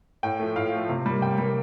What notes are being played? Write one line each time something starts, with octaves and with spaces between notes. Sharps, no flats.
A2 G5
F3 A3
A2 F5
F3 A3
C3
G3 A#3
C3 G5
G3 A#3